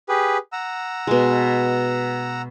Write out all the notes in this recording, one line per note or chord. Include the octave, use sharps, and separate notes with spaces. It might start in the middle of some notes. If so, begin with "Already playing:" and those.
G4 G#4 B4
F#5 A#5 E6
B2 G#3